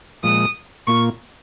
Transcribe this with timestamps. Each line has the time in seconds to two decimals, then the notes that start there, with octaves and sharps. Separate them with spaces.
0.23 A#2 F3 G#3 D#6
0.87 A#2 A#3 F4 C#6